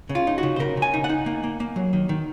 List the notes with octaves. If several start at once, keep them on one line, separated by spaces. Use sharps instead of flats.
C#3
F4
D#4
F#4
C#3
C5
C#3 A#4
C#3 G#5
D#4
F#5
D#4
A#3
A#3
A#3
F#3
D#3
D#3